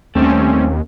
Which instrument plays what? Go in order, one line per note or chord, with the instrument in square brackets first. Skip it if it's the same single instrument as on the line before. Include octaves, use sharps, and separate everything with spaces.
[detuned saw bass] D#2 [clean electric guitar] G3 A3 [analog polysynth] C4 C#4